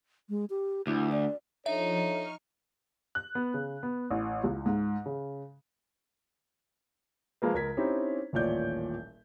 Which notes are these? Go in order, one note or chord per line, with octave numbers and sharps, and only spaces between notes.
G#3
G4
D2 E4
D5
F3 D4 D#4 A4 C#5 E5
C#6 F6
F#6
B3
C#3
B3
A1
C#2
G#2
C#3
F3 G#3 A#3 B4
C#2 A#4 G#6 B6
C4 C#4 D#4 E4 G4
D#1 A1 A#2 C#5 D5 G6